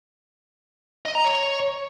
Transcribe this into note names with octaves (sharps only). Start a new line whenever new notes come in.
D#5
A#5
C#5